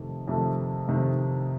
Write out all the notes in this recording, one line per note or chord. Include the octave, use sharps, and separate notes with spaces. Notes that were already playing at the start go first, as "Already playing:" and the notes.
Already playing: F2 C3 D#3 A3
F2 C3 D#3 A3
F2 C3 D#3 A3